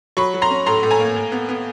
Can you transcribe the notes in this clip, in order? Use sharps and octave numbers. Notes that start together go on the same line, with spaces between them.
F#3 B5 C#6
F#3
A#5 C6
C#4
A2 A#5 C6
A2
G#5 A#5
A#3
A2
B3
B3